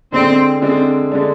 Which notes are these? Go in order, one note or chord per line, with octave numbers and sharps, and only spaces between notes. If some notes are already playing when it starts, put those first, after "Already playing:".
D3 G#3 C4 D4
D3 G#3 C4 D4
D3 G#3 D4